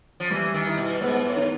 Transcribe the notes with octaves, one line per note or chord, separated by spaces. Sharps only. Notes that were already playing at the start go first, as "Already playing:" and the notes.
F3
E3 G3
D#3
E4
B2
G#2 B3
A2
D#3